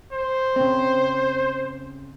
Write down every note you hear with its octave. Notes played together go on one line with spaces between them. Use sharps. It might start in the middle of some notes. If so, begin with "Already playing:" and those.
C5
C#3 C4